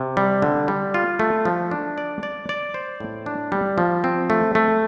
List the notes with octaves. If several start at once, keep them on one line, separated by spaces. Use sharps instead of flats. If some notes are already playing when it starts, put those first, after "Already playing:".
Already playing: C3
G3
D3
G3
F4
A3
F3
D4
D5
D5
D5
C5
A2
D4
G3
F3
C4
A3
A3